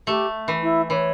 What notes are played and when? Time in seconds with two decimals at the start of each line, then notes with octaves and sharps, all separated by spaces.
0.07 A3 G4
0.48 E3
0.62 E4
0.90 E3 C#5